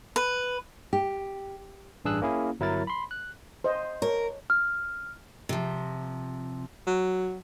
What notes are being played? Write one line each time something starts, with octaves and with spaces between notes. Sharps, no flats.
B4
G4
A1 G2 D4 G#4 E6 F#6
A#3 C#4 E4 G#4
G1 F#3 E4 A#4 A6
B5 C6
F#6
C5 D#5
A#4 C#5
F6
C3 F3
F#3